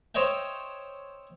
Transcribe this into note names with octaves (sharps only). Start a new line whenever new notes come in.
C5 C#5 D#5 E5 G5